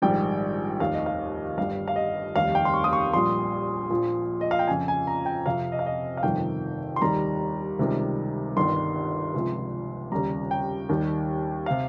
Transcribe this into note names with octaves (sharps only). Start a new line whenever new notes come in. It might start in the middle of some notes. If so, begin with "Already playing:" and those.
A#1 G#2 D#3 G3 G5
F1 D#2 D#3 F5
D#5
F5
G1 G2 G3 F5
F5
D#5
F1 D#2 D#3 G3 F5
G5
C6
C#6
D#6
C#6
A#1 A#2 G3 C6
A#1 A#2 F3
D#5
F5
G5
F2 C#3 F3 G#5
G#5
A#5
G5
F2 C3 F3 F5
D#5
F5
D#5
F5
G1 F2 C3 D#3 G5
C6
D#2 D#3 G3 A#5
C#2 C3 D#3 G3
G1 G2 D#3 G3 C6
C#2 C3 F3
D#2 C#3 G3 A#5
G5
D#2 D#3 G3
C3 F5